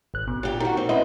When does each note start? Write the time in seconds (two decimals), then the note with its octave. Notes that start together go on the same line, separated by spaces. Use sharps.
0.14 G#1 F#6
0.28 B2
0.43 A#2 G4
0.60 D#3 F#4 A#4
0.77 C4
0.89 C#4 E4 B4 C5 D#5